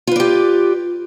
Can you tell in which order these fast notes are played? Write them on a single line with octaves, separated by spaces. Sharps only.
F4 B4 D5 G4